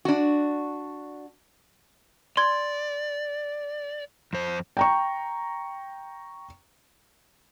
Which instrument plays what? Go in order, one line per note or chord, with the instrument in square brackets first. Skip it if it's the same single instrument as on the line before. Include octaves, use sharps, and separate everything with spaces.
[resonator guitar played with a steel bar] D4 F#4
[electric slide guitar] D5 [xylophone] C6 G#6
[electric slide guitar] F2 C5
[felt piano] G5 A#5 C#6